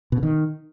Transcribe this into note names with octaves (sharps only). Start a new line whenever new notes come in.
B2
C#3
D#3